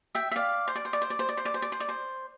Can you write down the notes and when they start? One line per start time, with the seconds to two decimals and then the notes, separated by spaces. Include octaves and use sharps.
0.15 E5 G5
0.31 E5
0.36 D5 F5
0.68 C5
0.75 D5
0.85 C5
0.93 D5
1.02 C5
1.10 D5
1.19 C5
1.29 D5
1.37 C5
1.45 D5
1.54 C5
1.62 D5
1.72 C5
1.80 D5
1.89 C5